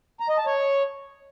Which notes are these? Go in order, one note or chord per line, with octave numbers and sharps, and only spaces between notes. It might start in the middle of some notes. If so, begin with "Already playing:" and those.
A#5
D#5
A5
C#5